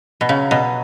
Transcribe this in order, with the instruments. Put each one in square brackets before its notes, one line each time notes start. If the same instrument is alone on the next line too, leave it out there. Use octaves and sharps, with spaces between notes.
[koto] B2
[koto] C#3 [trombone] F#3
[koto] B2